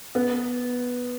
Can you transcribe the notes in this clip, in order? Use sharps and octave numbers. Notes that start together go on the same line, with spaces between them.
B3